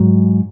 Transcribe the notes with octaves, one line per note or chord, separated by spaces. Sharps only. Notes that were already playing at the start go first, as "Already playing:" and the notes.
Already playing: G#2 F#3